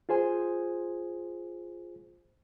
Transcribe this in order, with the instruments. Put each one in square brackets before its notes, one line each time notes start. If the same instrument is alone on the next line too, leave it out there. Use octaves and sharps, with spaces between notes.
[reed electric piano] F4 G#4 C5 G#5